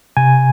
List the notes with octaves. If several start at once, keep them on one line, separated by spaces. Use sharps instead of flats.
C3 G#5